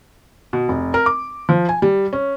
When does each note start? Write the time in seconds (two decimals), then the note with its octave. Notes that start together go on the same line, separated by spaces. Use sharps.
0.53 B2
0.69 F1
0.94 A#4
1.06 D6
1.49 F3
1.69 G#5
1.82 G3
2.13 C#4